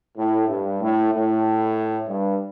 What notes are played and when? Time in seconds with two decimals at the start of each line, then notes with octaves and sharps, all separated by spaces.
0.17 A2
0.49 G2
0.81 A2
1.13 A2
2.08 G2